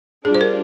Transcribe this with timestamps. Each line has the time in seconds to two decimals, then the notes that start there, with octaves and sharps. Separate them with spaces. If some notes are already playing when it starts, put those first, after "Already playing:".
0.25 G3 D4 F4 G#4
0.34 C5
0.41 A#4